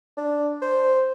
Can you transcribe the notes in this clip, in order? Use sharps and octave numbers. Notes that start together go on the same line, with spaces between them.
D4
C5